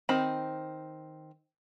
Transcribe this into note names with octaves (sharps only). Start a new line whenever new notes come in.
D#3 C4 B5